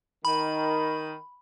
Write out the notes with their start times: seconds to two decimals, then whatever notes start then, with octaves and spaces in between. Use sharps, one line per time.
0.25 D#3 B5